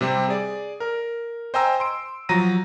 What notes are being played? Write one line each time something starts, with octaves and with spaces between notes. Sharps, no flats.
C3 G3 C4
G#4 D5
A#4
C5 D#5 G5 G#5 A#5 E6
C6 D7
F3 F#3 A#5 A#6 D#7